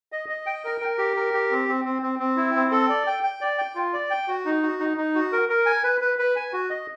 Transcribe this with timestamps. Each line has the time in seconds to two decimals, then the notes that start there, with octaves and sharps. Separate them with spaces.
0.12 D#5
0.29 D#5
0.46 G5
0.64 A#4
0.81 A#4
0.98 G4
1.16 A#4
1.34 G4
1.51 C4
1.68 C4
1.84 C4
2.02 C4
2.19 C4
2.36 E4
2.55 C4
2.71 A4
2.89 D5
3.06 G5
3.23 G5
3.41 D5
3.58 G5
3.75 F4
3.93 D5
4.10 G5
4.28 F#4
4.45 D#4
4.63 F#4
4.80 D#4
4.97 D#4
5.15 F#4
5.32 A#4
5.49 A#4
5.66 G#5
5.84 B4
6.01 B4
6.19 B4
6.36 G#5
6.53 F#4
6.70 D#5